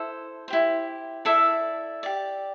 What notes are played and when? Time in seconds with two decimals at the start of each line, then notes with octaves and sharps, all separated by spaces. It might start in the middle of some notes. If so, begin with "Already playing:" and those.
Already playing: E4 A4 C5
0.48 E4 G4 C5
1.25 E4 A4 D5 E5
2.03 G4 D5